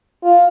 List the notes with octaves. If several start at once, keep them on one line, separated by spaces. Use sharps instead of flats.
F4